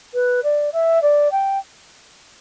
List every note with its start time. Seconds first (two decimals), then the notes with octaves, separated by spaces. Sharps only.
0.14 B4
0.43 D5
0.72 E5
1.02 D5
1.32 G5